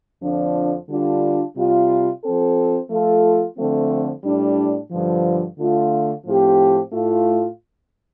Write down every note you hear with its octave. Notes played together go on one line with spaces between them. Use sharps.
F2 D3 F3 D4
D3 G3 D4 F4
C3 G3 F4
F3 C4 A4
F3 A3 F4 A4
D3 F3 A3 C4
A2 G3 D4
G2 D3 F3
D3 A3 F4
A2 F3 C4 G4
A2 A3 F4